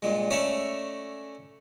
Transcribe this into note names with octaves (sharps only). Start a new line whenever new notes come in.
G2 A#2 G#3
A3 C#4 A#4 C#5 D5 E5